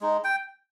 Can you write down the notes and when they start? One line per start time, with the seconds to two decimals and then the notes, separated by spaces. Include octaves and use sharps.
0.01 G#3 D#4
0.24 G5